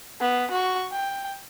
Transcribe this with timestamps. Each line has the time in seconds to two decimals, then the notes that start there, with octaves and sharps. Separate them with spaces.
0.21 B3
0.51 F#4 C#6
0.92 G5